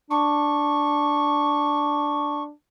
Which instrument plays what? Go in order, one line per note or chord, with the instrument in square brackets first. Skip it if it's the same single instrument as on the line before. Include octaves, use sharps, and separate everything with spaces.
[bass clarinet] D4 [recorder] C#6